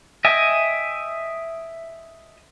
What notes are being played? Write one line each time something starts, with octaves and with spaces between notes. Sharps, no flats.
D#5 E5 G5 G#5